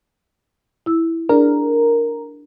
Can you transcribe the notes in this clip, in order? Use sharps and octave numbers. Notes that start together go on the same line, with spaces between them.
E4 E6
D4 G#4 A#4 D5